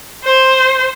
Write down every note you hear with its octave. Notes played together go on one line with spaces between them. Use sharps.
C5